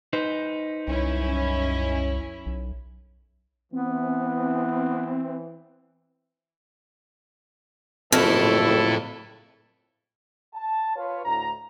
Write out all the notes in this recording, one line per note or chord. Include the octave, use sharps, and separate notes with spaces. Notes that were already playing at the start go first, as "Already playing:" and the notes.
D#4 B4 C5
C2 F#2 C#4 E4
B1
E3 B3 C4
F#1 F2 A2 E4 A4
A5
F4 B4 C#5
D2 A2 A#5